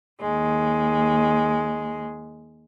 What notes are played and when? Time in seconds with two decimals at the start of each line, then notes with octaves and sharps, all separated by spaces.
0.22 D#2 G#3